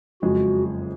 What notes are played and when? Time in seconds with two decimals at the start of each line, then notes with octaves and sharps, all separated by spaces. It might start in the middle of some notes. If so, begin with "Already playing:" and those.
0.22 F#1 F2 F3 G#3 F#4